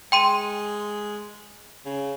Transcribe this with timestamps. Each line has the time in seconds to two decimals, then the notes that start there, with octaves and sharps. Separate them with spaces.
0.12 G#3 G5 C6 D#7
1.86 C#3